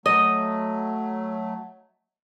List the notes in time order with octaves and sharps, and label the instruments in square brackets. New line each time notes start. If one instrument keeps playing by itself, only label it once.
[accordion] F#3 A3 [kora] D#5